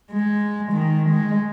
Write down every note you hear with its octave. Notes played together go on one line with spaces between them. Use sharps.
G#3
D#3
G#3